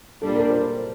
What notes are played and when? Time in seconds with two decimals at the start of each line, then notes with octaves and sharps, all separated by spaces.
0.21 A#2 G3 D4 A4
0.36 A#4
0.50 C5